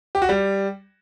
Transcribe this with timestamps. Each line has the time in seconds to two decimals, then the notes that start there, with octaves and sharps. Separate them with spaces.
0.15 G4
0.22 F#4
0.29 G3